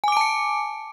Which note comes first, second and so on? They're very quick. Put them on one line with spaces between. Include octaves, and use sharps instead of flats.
G#5 D6 D7 A5 C#7